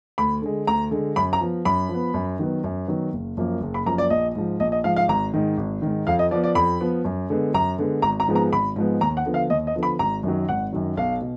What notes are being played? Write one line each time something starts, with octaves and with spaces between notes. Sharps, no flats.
D2 B5
D3 G#3
D2 A#5
D3 G#3
F#2 B5
A#5
F3 B3
F#2 B5
F3
B3
F#2
D#3 F#3 B3
F#2
D#3 F#3 B3
F#1
F#2 F3 A#3
F#1
B5
F#2 F3 A#3 A#5
D5
A#1 D#5
G#2 F3
A#1 D#5
D#5
G#2 F3 F5
F5
G#1 A#5
G#2 D#3
G#1
G#2 D#3
F2 F5
D#5
F3 B3 D5
D5
F2 B5
F3 B3
F#2
D3 G#3 B3
F#2 A#5
D3 G#3 B3
G#1 A#5
A#5
G#2 F3 G#3 B3
A#5
G#1 B5
G#2 F3 G#3 B3
D#2 A#5
F#5
D3 F3 B3
F5
D#2 D#5
D#5
D3 F3 B3
B5
G#1 A#5
F#2 D#3 F#3
G#1 F#5
F#2 D#3 F#3
B1 F5
B2